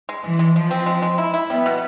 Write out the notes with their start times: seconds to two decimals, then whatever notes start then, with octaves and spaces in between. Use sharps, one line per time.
0.09 G#3
0.24 E3 G#3
0.39 G#3
0.55 F3 G#3
0.71 C4
0.86 G#3
1.02 G#3
1.18 E4
1.34 E4
1.50 G3 B3
1.66 B2